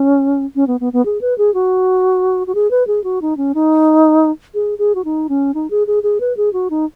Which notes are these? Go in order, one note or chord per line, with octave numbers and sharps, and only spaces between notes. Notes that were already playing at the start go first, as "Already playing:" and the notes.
Already playing: C#4
C#4
B3
B3
B3
G#4
B4
G#4
F#4
F#4
G#4
B4
G#4
F#4
D#4
C#4
D#4
G#4
G#4
F#4
D#4
C#4
D#4
G#4
G#4
G#4
B4
G#4
F#4
D#4